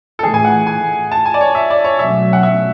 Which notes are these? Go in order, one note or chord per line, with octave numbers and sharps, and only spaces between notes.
A4
A2 E3 A3 G#4
G#5
F#5
G#5
A5
G#5
D5
C#5
E5
D5
C#5
B2 F#3 A3 C#4 E5
F#5
E5